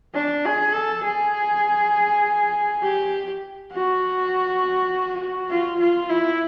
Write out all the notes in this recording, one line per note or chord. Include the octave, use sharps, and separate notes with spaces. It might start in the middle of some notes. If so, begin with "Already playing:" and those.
D4
G#4
A4
G#4
G4
F#4
F4
F4
E4